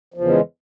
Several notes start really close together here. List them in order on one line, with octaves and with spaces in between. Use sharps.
F3 E2 C#3 E3 G#3